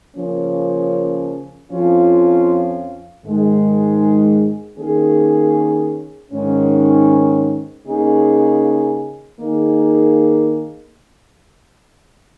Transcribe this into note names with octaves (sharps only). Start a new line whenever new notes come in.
C#3 F3 A#3 C#4
F2 F3 C#4 F4
G#2 D#3 G#3
D#3 A#3 C#4 G#4
G#2 D#3 C#4
C#3 A#3 D#4 G#4
D#3 A#3 D#4 G#4